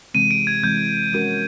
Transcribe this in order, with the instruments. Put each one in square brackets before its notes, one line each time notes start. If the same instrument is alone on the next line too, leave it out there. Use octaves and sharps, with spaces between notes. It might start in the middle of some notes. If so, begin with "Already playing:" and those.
[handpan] C3 E3 G#3 C4 [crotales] D#7
[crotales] D7
G#6
[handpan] C3 E3 G#3 C4 [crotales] G6
[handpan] F3 G#3 C#4 F#4 A#4